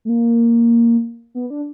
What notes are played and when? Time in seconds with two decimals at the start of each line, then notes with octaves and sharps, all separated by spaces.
0.05 A3
0.09 A#3
1.35 B3
1.50 D4